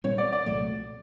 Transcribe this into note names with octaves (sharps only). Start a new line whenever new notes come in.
A#2 G3 C4 C#5
D5
D5
C2 A#2 F#3 A3